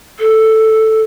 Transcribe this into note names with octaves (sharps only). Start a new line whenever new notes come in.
A4